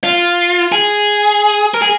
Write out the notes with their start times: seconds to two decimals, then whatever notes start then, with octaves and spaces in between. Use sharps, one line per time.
0.04 F4
0.72 G#4
1.74 A#4
1.82 G#4